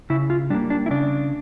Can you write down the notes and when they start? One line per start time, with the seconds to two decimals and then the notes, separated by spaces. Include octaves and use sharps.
0.10 C#3 E4
0.30 F4
0.50 G3 D4
0.54 A#3
0.70 D4
0.86 E4
0.91 C#3 D4